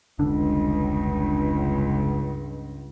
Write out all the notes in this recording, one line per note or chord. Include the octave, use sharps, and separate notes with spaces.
F1 C#2 G2 D3 D4